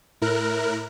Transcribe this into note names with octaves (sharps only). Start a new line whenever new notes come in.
A2 E4 A#4 F#6